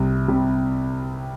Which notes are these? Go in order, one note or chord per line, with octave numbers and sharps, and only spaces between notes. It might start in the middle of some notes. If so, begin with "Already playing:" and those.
Already playing: C2 C3
C3 G3